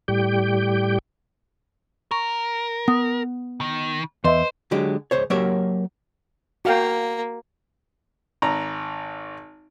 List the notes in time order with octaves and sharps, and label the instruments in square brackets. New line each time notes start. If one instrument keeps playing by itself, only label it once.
[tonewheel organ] A2 G3 G4 G5
[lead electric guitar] A#4 [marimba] C#6
[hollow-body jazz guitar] B3 [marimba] D#6
[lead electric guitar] D#3
[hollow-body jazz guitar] E2 E5 [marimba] B4 D#5 C6 [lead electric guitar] C5
[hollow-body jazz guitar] D3 F#3 G#3 G4
C#2 C5 C#5
F#3 A#3 G4 A#4 C#5 E5
[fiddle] A#3 [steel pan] F#4 F5 G5
[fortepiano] G#1 A#5